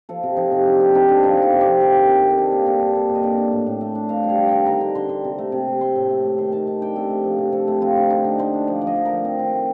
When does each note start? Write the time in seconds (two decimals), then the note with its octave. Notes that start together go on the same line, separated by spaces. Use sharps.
0.09 F3 A4
0.23 C3
0.37 F3 D#4
0.51 C3
0.66 D3
0.80 C4
0.95 C4 D#4
1.09 D3 D4
1.23 F3 D#4
1.38 D4 F4
1.52 C3
1.61 G4
1.66 F3
1.80 D#3 G4
1.95 D#3
2.08 C3
2.24 C3
2.30 A4
2.38 D4 G4
2.52 A#3
2.66 D4 A4
2.80 G2
2.95 A#3 A4
3.09 A#2
3.15 D#5
3.23 D4 D5
3.37 D4
3.52 A2
3.67 A2
3.81 A3
3.95 D4
4.09 C4 F5
4.24 G3
4.29 F5
4.38 G3
4.48 D#3 G5
4.66 D3 A#5
4.81 D3
4.95 D3 C6
5.09 D3
5.25 C3
5.38 A3
5.52 C3
5.67 C3
5.81 A3 C6
5.96 A2
6.10 A3
6.24 A3
6.38 D#3 C6
6.52 D#3 A5
6.67 D#3 A5
6.81 D4 G5
6.96 C3 A4
7.10 A3
7.25 F3
7.38 C3
7.52 C4 A4
7.68 A3
7.81 C4 F4
7.97 D3
8.10 D4 D#4
8.24 D3
8.38 A3 C5
8.54 D4
8.67 F3 D5
8.81 F3
8.87 D#5
8.96 D3
9.06 F3 A#4
9.25 C4
9.39 D#3
9.54 A3